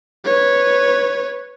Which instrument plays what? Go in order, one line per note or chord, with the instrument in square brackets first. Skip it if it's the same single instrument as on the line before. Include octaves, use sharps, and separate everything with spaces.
[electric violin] B4 C#5